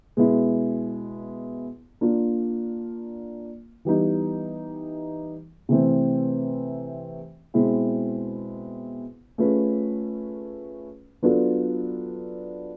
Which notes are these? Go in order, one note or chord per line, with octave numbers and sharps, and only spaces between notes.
B2 G#3 B3 E4
A#3 D4 F4
E3 G3 B3 D#4
C3 E3 A3 C4
B2 G#3 C4 E4
A3 C#4 F4 G#4 B4
F#3 B3 D4 F4 A4